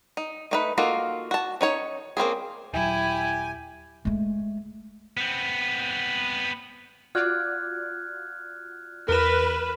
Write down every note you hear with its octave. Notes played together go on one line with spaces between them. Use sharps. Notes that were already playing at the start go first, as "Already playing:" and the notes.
D#4
A3 D#4 B4
A#3 D#4 F4 F#4 A4
F#4 A5
C#4 D#4 C#5
A#3 C4 C#4 G#4
D#1 F#3 E4 G4 G#5
G#3 A3
B3 C4
F4 F#4 D5 F6 F#6 G#6
E2 A#4 B4 F6 E7